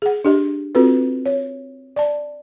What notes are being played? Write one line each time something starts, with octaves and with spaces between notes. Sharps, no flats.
G#4 F#5
D4 G4 D#5
C4 F4 F#4 A4 B4
C#5
D5 A5